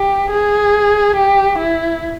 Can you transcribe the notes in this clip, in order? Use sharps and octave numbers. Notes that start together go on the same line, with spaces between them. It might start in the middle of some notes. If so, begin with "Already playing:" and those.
Already playing: G4
G#4
G4
E4